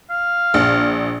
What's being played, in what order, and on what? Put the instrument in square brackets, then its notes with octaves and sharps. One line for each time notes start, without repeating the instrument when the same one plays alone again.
[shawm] F5
[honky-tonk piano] A#1